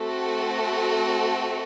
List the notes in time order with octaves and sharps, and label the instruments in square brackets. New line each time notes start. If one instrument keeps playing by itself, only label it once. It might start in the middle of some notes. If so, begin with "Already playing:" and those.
Already playing: [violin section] A3 C4 F#4 A4